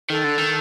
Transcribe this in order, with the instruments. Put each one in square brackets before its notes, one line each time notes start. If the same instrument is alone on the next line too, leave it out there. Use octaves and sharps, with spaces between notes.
[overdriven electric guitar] D#3 [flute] A4
[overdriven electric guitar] D3
D#3